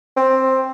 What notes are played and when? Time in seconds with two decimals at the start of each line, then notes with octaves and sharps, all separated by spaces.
0.17 C4